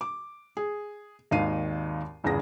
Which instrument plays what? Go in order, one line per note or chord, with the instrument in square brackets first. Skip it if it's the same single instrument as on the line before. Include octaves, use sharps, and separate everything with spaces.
[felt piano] D6
G#4
G#1 D#2 D#4 F5 C7 D#7
G1 E2 C#3 G#4 A#6